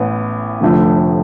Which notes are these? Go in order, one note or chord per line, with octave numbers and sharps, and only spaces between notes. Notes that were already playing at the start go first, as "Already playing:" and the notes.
Already playing: A1 A2 B3
F1 F2 D3 A3